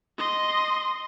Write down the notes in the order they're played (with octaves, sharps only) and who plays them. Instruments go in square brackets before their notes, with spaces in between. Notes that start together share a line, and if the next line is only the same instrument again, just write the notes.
[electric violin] D#5 C6